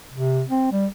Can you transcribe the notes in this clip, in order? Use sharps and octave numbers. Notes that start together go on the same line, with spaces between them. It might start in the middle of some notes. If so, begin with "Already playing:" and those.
C3
C4
G3